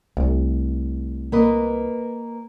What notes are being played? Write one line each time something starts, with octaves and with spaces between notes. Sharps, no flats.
C2 A3
A#3 B4 D#5